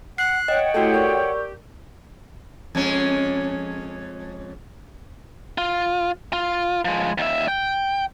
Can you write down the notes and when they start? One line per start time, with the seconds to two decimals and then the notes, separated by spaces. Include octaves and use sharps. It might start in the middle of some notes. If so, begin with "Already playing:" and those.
0.18 F#5 F#6 C7
0.48 C#5 D#5 F#5 G5
0.74 A3 E4 F#4 G4 A4
0.94 A#4 D5 C#6
2.75 F2 G#3 C#4
5.58 F4
6.33 F4
6.85 F3 G#3
7.18 D#2 E5
7.48 G5